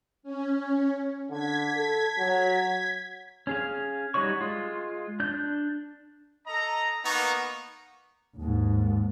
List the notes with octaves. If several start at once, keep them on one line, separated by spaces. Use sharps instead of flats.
C#4
D3 G#6 B6
A4
F#3
C#4 G#4 F5
G3 D#4 F#4 C#5 C#6
G#3 F4
D4 G6
A4 D#5 A#5
A#3 B3 D#4 A#5 C#6
D#2 G#2